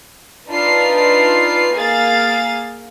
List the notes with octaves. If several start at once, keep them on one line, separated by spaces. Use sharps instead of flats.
D4 D#4 F4 B4 C7
A#3 G#4 F5 A6